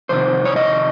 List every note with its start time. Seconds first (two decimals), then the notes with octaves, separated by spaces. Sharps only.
0.09 F2 C3 D#3 C5
0.45 C#5
0.56 D#5